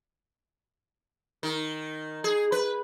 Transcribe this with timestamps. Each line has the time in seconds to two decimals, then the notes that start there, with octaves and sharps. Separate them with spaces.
1.43 D#3
2.24 G#4
2.52 B4